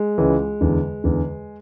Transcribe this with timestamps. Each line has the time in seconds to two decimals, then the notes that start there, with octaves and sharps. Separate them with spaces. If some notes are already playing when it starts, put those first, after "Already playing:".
Already playing: G#3
0.18 C#2 C#3 E3
0.61 E2 D3
1.04 E2 D3